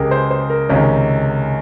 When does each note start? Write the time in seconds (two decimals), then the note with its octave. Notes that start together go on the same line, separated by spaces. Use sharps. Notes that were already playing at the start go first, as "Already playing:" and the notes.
Already playing: C#2 C#3 G4 G#4 A#4
0.11 C5
0.30 C5
0.50 A#4
0.69 C#2 C3 D#3 C#4